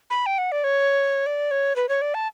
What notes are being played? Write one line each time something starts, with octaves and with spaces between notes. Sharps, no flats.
B5
G5
F#5
D5
C#5
D5
C#5
B4
C#5
D5
A5